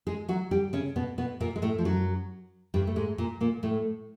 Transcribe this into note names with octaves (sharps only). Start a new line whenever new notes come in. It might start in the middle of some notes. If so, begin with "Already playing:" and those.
G#3 G#4
F#3 F#4
G3 G4
C#3 C#4
B2 B3
B2 B3
A#2 A#3
G#3
A2 A3
F3
F#2 F#3
G2 G3
A3
G#2 G#3
A#2 A#3
A#2 A#3
A2 A3